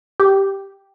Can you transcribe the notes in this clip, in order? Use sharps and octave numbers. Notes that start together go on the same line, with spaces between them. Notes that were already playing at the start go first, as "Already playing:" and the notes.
G4